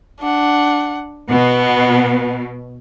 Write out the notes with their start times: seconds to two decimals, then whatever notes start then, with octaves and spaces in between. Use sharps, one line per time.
0.20 D4 F#5
1.31 B2 B3